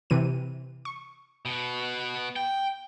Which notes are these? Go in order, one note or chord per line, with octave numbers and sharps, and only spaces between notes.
C3 E3 D#7
C#6
B2 B3
G5